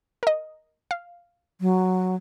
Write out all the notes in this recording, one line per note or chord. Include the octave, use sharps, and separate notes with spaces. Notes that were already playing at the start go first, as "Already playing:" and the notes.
A#4 D#5
F5
F#3